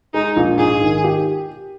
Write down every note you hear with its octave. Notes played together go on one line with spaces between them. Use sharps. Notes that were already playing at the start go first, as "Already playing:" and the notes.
G#3 D#4
A#1
G#2 G#4
D#3
G4